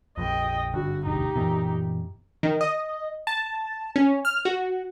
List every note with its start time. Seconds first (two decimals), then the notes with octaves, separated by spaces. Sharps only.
0.17 A#1 F2 D#5 G5
0.74 G#1 G2 D3 F#4
1.06 E1 A1 D2 D#4 G4
1.36 F#2 A#2 E3 B3
2.43 D#3
2.61 D#5
3.27 A5
3.96 C#4
4.25 F6
4.45 F#4